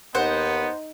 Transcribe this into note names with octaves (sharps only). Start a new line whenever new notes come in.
D#2 B3 D#4 C5 F#5